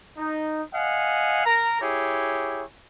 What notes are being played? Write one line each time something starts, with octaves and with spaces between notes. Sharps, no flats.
D#4
D#5 F5 F#5 G#5
A#4 A#5
E4 G4 G#4 C#5